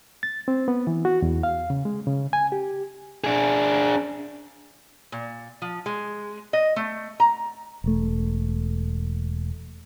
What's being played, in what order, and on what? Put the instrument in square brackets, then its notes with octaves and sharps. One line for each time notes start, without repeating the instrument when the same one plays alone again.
[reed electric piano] A6
C4
B3
E3
F#4
E2
F5
C#3
G#3
C#3
G#5
G4
[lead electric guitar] D4 G#4
[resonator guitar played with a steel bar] A#2
F3
G#3
D#5
A3
A#5
[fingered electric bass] E1 A3